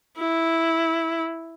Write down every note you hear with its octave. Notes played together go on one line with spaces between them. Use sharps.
E4